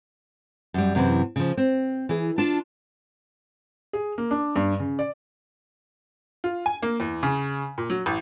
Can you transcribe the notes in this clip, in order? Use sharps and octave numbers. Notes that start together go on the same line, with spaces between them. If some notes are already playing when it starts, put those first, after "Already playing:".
F#2 G3
F#2 C3 E3
C#3 F3
C4
E3 G#4
D4 F4 A5
G#4
A#3
D4
G2
C#3
D5
F4
G#5
A#3
E2
C#3
A#2
F#3
A1